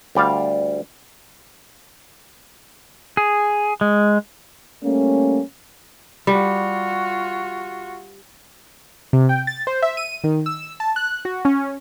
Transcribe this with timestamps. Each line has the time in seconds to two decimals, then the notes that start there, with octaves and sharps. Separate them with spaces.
0.15 D2 G3 D5 F5
3.17 G#4
3.81 G#3
4.83 G3 A3 A#3 C#4
6.27 G3 F4 F#4
9.13 C3
9.29 G5
9.47 A6
9.67 C5
9.82 E5
9.97 D#7
10.24 D#3
10.46 E6
10.80 A5
10.96 F#6
11.25 F#4
11.45 C#4